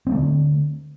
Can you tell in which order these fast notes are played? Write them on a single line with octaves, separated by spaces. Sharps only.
C4 A#3 A3 D3